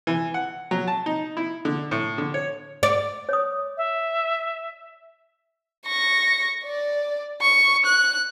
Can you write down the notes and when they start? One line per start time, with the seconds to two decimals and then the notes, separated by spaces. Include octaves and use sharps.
0.07 E3
0.34 F#5
0.71 F#3
0.88 A5
1.06 D#4
1.37 E4
1.65 D3
1.91 A2
2.18 D3
2.34 C#5
2.83 D5
3.29 C#5 D#6
3.77 E5
5.86 C#6 A#6
6.64 D5
7.41 C#6
7.86 F#6